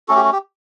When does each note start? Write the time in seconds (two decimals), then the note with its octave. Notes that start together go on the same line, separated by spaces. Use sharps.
0.08 A3 C#4 F#4 A4
0.16 G4
0.24 F#4
0.32 G4